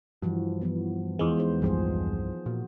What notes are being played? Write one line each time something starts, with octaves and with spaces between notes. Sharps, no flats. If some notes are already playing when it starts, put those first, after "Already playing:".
G2 E3 F3 F#4
E3 F3 B3
E2 E3 G#3 F4 C5
B3 D#4 C5
C2 G2 F3 G3 G#4 C5
A#2 F#4